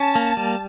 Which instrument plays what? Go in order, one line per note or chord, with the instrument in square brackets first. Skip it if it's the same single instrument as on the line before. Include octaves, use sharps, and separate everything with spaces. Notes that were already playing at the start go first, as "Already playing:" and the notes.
Already playing: [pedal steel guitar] C#4 [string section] A5
[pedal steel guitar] A#3
G3